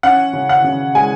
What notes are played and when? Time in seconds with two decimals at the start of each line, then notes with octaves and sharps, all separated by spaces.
0.03 C#4 F#5
0.33 C#3
0.49 F#5
0.64 C#3
0.95 G#3 G#5